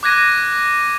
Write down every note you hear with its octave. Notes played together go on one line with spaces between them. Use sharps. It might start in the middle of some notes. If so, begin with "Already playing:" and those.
D6 F#6 G#6 A#6 D#7